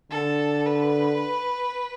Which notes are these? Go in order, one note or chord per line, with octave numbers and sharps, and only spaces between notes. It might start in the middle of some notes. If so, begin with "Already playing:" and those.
D3 A4
B4